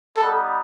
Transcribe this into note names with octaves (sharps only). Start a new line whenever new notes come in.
G3 B3 D#4 A4